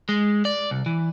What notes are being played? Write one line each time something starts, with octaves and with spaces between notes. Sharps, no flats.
G#3
D5
C2
E3